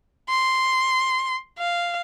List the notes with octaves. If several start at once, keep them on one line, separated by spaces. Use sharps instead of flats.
C6
F5